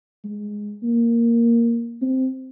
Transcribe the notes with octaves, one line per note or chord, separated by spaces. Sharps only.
G#3
A#3
C4